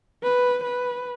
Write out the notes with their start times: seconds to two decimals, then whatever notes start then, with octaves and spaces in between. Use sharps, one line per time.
0.24 B4
0.64 B4